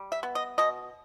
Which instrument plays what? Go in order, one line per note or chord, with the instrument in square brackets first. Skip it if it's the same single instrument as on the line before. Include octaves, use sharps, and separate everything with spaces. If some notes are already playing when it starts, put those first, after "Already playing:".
Already playing: [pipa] G3
E5
B3
D#5
B2 D#5